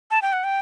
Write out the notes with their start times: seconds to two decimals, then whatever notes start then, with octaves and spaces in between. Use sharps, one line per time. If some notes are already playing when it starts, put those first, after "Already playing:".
0.11 A5
0.22 G5
0.33 F#5
0.44 G5